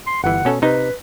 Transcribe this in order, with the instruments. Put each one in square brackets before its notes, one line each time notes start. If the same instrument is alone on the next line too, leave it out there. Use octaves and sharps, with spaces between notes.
[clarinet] C6
[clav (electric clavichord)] G1 E3 [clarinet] F#5
[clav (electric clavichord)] B2 C#4 A4
[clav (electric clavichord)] C3 D#4 [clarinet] B4